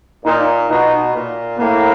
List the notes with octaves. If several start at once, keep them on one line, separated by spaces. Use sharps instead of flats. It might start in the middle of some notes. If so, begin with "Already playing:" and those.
A#2 D#4
B2 D#4
A#2
A2 A#3